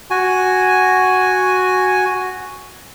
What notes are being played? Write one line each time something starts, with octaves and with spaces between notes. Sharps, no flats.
F#4 G#5